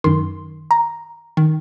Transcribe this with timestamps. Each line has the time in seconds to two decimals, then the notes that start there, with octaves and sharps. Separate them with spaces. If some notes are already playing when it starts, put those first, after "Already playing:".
0.04 F#2 D#3 C6
0.71 A#5
1.37 D#3